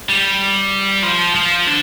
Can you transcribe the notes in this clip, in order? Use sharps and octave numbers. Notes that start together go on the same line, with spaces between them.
G3
F3
F3
D3